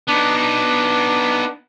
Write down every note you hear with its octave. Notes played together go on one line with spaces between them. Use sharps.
B3 D4 D#4
D4